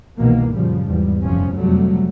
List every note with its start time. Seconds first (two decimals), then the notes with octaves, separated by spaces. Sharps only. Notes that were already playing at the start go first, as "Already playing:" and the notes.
0.19 C2 B2 D#3 E3 A#3
0.54 F#2 A#2 C#3 F3 G3
0.84 E2 G#2 G3
1.22 F1 F#2 C3 F3 C#4
1.57 F2 C3 F#3 G3 A3